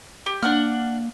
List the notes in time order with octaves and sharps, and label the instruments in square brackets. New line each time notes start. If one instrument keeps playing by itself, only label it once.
[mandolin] G4
[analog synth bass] A#3 [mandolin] D4 F#5 F6